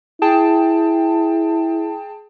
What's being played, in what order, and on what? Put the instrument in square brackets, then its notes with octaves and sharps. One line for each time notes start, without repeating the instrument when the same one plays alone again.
[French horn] E4 [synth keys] G#4 G5 A5